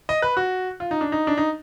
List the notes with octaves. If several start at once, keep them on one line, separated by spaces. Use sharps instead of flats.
D#5
B4
F#4
F4
D#4
D4
D#4
D4
D#4